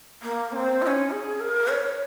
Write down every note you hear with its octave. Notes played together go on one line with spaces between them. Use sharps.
A#3
C#4
C4
F4
C#4
G#4
A#4
C#5